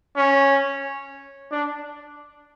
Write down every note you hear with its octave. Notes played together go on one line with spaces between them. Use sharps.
C#4
D4